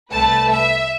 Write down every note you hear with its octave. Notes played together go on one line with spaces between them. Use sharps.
C2 A3 B4 A5
E5